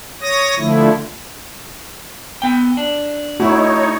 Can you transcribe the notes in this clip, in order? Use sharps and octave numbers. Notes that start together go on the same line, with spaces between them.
C#5 D#6 A#6
D3 F3 A3 E4
B3 G5
D4
A2 D#4 E4 F#4 C#5